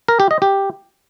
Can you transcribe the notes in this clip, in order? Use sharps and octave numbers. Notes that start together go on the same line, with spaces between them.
A#4
G4
D#5
G4